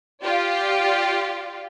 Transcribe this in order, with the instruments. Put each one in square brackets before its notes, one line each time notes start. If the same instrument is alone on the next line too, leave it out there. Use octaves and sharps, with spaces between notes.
[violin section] F4 G4 D5